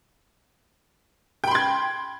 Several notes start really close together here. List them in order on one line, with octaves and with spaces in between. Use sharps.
G5 B5 C6 G#6